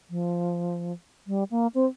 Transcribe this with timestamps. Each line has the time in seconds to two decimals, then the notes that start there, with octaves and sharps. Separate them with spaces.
0.10 F3
1.27 G3
1.51 A#3
1.75 C4